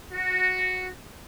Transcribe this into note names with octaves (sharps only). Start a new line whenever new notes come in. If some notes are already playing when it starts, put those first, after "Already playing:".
F#4